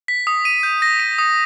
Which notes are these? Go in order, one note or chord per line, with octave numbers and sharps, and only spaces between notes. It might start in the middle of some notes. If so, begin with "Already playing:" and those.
B6
D#6
D#7
G6
A#6
D#7
D#6